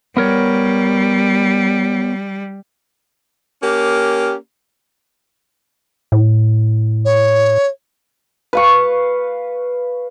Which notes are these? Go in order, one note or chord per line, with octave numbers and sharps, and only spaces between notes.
G3 B3 A#4 C#5
A#3 C#4 G4
A2
C#5
B4 F5 C#6